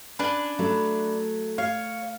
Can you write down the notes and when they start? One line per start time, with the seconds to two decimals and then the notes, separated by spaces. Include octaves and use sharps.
0.19 C#4 D4 B4
0.59 F#3 A3
1.58 C#5 F5